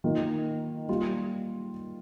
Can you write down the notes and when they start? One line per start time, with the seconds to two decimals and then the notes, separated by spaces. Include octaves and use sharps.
0.04 D#3 A#3 F4
0.88 G3 A#3 F4